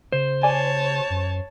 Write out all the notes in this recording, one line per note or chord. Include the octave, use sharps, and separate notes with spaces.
C#3 C5
C#5 D5 G#5 A5
F#2